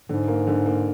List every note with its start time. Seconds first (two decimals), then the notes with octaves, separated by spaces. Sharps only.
0.09 G#2 D3
0.28 A#3
0.47 D3
0.66 A#3